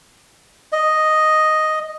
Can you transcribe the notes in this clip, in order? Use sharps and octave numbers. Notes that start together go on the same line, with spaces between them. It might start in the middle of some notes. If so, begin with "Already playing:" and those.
D#5